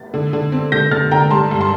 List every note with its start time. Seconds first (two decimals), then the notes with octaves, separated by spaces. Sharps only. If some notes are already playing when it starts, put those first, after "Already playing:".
Already playing: A6
0.14 D3
0.33 D3
0.52 C4
0.72 D3 G6 A#6
0.91 D3 F6 A6
1.11 D3 G5 A#5
1.31 G3 A5 C6
1.51 G2
1.61 A5 C6